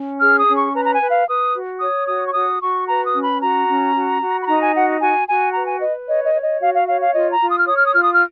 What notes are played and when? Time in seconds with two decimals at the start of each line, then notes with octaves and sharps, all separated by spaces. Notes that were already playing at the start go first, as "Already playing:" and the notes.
Already playing: C#4
0.21 G#4 F6
0.39 D#6
0.48 C#4
0.56 C#6
0.74 B4 A#5
0.85 A#5
0.92 G#5
1.01 B4
1.10 F5
1.28 B4 D#6
1.54 F#4
1.81 C#5 D#6
2.08 F#4 D#6
2.27 C#6
2.34 F#4 D#6
2.61 F#4 C#6
2.88 B4 A#5
3.05 D#6
3.14 C#4
3.23 B5
3.40 F#4 A#5
3.68 C#4
3.94 F#4
4.21 F#4
4.41 B5
4.47 D#4 A#5
4.61 G#5
4.74 F#4 F#5
5.01 F#4 G#5
5.27 F#4 G#5
5.54 B4 A#5
5.67 G#5
5.81 B4 D#5
6.07 C#5 D#5
6.25 D#5
6.34 C#5
6.43 D#5
6.61 F#4 F5
6.74 F5
6.87 C#5 F5
7.01 F5
7.14 F4 D#5
7.32 A#5
7.41 F4
7.50 D#6
7.58 F6
7.67 C#5 D#6
7.76 F6
7.85 D#6
7.94 F4 F6
8.04 D#6
8.13 F6